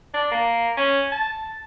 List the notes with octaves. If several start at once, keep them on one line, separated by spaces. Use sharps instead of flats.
D4
A#3
C#4
A5